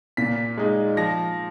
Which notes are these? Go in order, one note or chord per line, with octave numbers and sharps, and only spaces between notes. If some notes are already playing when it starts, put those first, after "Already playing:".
A#2 B6
G#3 D#4
F3 A#6